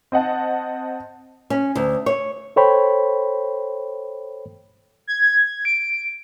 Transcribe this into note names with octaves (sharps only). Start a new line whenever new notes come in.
C4 D#5 F#5 A5
C#4
D2
C#5
A4 C5 C#5 G5 B5
G#6
D7